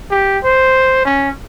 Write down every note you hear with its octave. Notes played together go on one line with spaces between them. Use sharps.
G4
C5
C#4